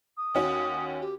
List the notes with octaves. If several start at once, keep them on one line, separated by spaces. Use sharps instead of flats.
D#6
D#2 C#4 F#4
G4